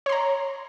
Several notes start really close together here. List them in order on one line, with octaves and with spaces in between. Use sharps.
C#5 C6 A#5